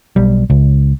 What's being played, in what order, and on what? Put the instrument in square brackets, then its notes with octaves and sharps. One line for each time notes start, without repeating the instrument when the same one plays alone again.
[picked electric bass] B1 G3
C#2